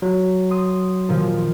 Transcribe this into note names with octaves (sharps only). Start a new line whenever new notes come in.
F#3
C6 D#6
A#2 D#3 F3